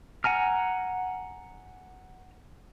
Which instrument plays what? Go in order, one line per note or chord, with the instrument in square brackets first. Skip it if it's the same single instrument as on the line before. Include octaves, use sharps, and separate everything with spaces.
[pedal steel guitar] F#5 G#5 A#5 F6